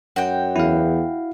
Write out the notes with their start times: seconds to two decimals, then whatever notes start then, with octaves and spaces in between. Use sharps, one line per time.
0.16 F#2 F#4 G5
0.56 E2 E4 F5